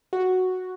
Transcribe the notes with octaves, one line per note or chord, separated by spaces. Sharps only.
F#4